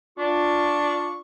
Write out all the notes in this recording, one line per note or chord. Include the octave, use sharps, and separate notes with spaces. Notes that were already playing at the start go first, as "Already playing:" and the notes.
D4 F4 C#6